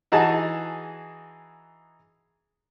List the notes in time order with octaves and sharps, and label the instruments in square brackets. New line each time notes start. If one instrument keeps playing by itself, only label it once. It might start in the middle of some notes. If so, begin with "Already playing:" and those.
[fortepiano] E3 D#4 F#4 G#4 A5